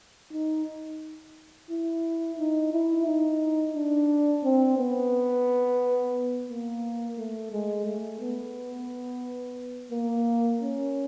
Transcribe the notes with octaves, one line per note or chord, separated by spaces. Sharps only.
D#4
E4
D#4
E4
D#4
D4
C4
B3
A#3
A3
G#3
A3
B3
A#3
C#4